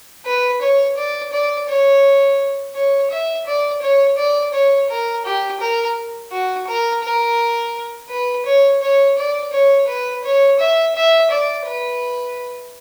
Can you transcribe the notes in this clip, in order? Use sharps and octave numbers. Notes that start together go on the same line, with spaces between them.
B4
C#5
D5
D5
C#5
C#5
E5
D5
C#5
D5
C#5
A#4
G4
A#4
F#4
A#4
A#4
B4
C#5
C#5
D5
C#5
B4
C#5
E5
E5
D5
B4